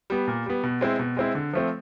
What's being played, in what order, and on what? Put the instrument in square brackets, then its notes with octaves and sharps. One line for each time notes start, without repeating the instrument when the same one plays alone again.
[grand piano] G3 B3
A#2
G3 B3
B2
G#3 C4 E4
B2
G#3 C4 E4
D3
F3 A3 C4